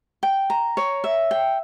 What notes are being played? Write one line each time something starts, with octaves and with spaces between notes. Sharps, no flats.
G5
A#5
C#5
E5
G5